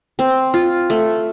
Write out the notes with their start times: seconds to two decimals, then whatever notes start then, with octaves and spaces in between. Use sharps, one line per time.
0.19 C4
0.54 F4
0.90 A3